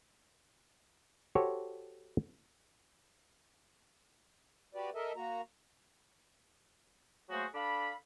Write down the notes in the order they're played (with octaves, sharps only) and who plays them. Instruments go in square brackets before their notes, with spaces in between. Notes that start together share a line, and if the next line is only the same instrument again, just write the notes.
[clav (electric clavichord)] F#4 G4 A4 C5 C#5
[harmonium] F#4 G4 B4 D5
A4 A#4 D#5 E5
A#3 F#4 A#5
[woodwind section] F#3 A3 A#3 F#4 G#4 C5
D4 A4 F5 B5